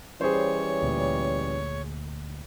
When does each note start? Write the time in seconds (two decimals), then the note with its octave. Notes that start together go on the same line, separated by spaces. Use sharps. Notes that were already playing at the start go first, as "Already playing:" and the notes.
0.21 E3 G3 C#4 G#4 C5 C#5
0.83 D2 A#2